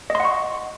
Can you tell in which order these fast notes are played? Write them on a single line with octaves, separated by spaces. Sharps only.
D#5 C6 F#5 C#6